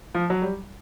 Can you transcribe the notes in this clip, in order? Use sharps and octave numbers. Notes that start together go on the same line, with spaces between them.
F3
F#3
G3